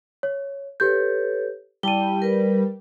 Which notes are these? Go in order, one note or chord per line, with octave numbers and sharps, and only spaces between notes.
C#5
G4 A4 B4 C#5 G6
G3 E4 G5 A5 D#7 G7
A#4 B4